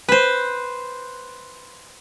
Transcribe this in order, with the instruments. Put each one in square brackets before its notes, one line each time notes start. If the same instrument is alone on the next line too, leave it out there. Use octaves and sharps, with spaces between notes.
[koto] B4 C5